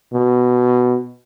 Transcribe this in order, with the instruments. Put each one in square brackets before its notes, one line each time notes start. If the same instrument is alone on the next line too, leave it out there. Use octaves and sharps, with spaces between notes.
[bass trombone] B2